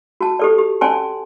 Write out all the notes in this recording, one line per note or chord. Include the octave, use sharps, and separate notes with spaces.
F#4 A5
G4 A4 D5
G4
C#4 D5 G#5 A5 C6